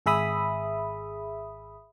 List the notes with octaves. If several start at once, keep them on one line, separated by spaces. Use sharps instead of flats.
G#1 G#4 E5 B5 D#6